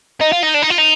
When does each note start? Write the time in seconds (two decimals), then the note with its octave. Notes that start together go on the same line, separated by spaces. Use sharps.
0.21 D#4
0.32 F4
0.43 D#4
0.54 D4
0.62 D#4
0.70 F4
0.78 D#4